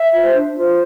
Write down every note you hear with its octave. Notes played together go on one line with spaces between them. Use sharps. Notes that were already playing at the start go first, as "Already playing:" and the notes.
Already playing: E5
F4 C5
D4
F4 C5